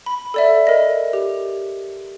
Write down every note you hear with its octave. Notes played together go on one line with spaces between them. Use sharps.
B5
A4 D5 E5
A#4 D#5
G4